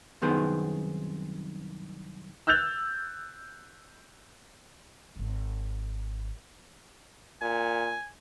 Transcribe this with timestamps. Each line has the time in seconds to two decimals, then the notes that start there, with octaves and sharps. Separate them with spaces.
0.22 C2 F#2 D#3 B3 G#4 C5
2.47 E6 F#6 G6 A6 F7
5.16 D#1 G#1
7.42 A#2 G#5